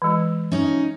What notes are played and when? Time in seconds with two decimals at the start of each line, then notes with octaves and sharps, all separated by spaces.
0.02 E3 G#3
0.52 C#4 D#4